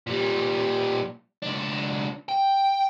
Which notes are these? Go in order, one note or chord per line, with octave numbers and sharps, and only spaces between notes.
A#2 G3
C#2 D4
G5